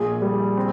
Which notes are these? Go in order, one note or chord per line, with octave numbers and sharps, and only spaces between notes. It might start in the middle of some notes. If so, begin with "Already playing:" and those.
Already playing: A#1 G#4
G3
C4